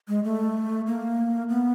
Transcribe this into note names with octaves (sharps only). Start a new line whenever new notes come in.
G#3
A3
A#3
B3